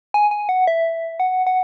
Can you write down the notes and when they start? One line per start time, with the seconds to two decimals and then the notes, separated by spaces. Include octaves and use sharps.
0.14 G#5
0.31 G#5
0.49 F#5
0.67 E5
1.20 F#5
1.47 F#5